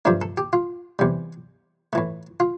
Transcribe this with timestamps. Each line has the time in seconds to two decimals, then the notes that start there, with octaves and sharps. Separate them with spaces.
0.05 G2 F3 A3 D4
0.22 A4
0.38 G4
0.53 F4
0.99 E2 C3 G3
1.93 A2 E3 A3
2.40 F4